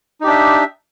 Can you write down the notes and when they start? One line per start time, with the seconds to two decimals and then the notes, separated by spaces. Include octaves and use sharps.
0.21 D#4
0.24 G4
0.27 D4
0.30 E5